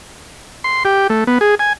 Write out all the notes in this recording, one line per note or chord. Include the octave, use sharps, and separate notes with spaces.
C6
G4
A3
B3
G#4
G#5